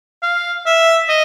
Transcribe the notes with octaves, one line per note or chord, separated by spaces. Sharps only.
F5
E5
D#5